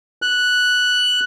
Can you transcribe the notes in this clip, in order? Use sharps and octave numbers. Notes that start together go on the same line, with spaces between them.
F#6